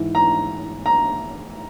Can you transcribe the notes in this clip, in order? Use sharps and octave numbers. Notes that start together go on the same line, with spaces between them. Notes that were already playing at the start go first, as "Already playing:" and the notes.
Already playing: G#2 E3
A#5
A#5